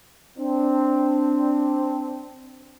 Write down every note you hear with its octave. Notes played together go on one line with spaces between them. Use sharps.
C4 D4